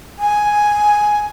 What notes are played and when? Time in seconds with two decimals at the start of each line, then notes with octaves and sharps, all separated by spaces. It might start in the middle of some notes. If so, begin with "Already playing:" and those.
0.18 G#5